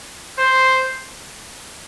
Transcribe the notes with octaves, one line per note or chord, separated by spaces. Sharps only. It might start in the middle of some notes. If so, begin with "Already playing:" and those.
C5